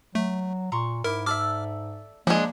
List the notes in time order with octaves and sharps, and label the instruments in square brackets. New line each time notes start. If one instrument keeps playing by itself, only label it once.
[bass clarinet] F#3 [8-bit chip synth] A3
[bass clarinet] A#2 [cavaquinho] A#5 C6 C#6
[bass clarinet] G#2 [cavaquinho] E4 D6 [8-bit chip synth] A#4
[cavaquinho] A4 D5 E5 [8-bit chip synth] D6 F6
[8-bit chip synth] F3 [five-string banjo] G#3 D4 [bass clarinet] A#3